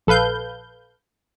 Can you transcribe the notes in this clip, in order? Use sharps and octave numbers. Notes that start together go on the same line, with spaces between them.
A#1 A4 B4 F5 G6